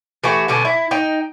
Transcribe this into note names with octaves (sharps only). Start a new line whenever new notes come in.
E3 A3 F#4 G4
B2 D3 F#3 C#4
E4
D#4 G5